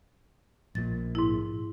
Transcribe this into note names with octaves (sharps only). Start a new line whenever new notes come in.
A#1 A#2 A6
G#2 E4